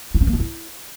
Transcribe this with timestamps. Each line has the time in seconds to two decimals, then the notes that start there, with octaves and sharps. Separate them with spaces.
0.14 E4
0.21 C#4
0.27 A#3
0.33 D4
0.40 E4